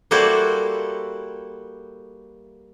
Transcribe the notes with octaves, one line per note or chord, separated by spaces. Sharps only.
G3 A#3 E4 F#4 A4 C5